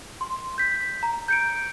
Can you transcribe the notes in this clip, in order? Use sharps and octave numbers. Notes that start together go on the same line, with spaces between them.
C6
G6 B6
A#5
G6 C#7 D7